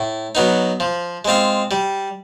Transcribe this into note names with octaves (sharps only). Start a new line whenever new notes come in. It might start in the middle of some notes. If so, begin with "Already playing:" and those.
Already playing: A2
F#3 B3 D#4
F3
G#3 C4 F4
G3